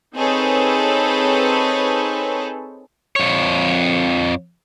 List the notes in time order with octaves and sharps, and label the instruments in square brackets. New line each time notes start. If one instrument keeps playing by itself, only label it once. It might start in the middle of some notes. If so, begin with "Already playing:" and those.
[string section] C4 D#4 G#4 A4 B4 C#5
[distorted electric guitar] F2 C#5